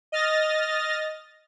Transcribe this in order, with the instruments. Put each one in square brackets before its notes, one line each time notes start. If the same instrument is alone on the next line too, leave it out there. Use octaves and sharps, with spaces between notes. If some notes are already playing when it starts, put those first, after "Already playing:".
[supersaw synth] D#5 F6 A6 A#6